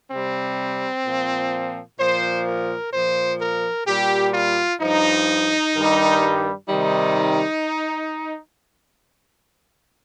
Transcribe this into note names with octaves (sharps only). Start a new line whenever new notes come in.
C3 G3 C4
A#2 F3
A#2 F3 C5
A#4
A#2 F3 C5
A#4
A#2 G3 G4
F4
G2 F3 D#4
G2 D#3 G3
C3 D#3 G3 D#4